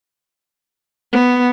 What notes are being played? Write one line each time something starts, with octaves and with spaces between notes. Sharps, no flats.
B3